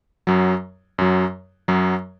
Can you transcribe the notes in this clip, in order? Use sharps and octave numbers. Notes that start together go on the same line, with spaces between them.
F#2 F#3
F#2 F#3
F#2 F#3